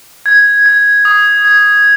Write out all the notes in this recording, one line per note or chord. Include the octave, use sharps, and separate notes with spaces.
G#6
G#6
D#6
G#6